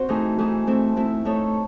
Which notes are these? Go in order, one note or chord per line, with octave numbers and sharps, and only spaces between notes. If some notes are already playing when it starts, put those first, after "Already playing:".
Already playing: C4 F#4 C5
E3 A3 D#4 G#4
E3 A3 D#4 G#4
A3 C4 E4
A3 C4 E4
A3 D#4 A4 C#5